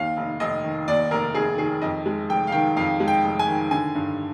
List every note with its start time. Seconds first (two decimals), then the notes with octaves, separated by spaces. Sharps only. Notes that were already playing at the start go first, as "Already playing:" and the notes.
Already playing: D#2 F5
0.17 F1
0.40 F1 D#5
0.64 D#3
0.88 D#2 D5
1.11 F1 A#4
1.34 F1 G#4
1.58 D#3 G#4
1.82 F2 D#5
2.06 G#3
2.29 F1 G5
2.47 F5
2.52 D#3 G5
2.77 F2 F5
3.00 G#3
3.08 G5
3.24 F1
3.39 G#5
3.47 D#3
3.71 D3 G#5
3.95 G2